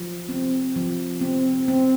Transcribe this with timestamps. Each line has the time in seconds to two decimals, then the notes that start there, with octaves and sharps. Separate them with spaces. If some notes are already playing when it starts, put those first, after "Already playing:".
Already playing: F3
0.29 C4
0.76 F3
1.21 C4
1.68 C4